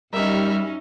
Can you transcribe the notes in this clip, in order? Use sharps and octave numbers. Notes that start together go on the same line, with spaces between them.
F#2 G3 C#4 D#4 A#4 D#5 E5 F6